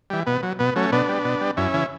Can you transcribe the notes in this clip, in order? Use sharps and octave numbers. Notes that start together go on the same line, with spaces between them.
E3 G3
B2 B3
F#3
B2 B3
F#3 A3 C#4
B2 B3 D4
G3
B2
G3
F#2 C#4 E4
C#3 E3